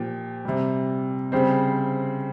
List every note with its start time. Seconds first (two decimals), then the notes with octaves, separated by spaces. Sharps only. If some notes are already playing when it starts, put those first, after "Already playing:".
Already playing: A#2 F3 G4 G5
0.45 C3 G3
1.32 C#3 G3 C4 C5